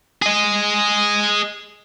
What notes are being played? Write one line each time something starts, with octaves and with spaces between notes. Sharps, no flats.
G#4 D#5